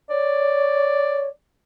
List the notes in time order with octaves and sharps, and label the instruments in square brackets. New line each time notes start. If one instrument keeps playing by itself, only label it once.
[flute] C#5 [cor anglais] D5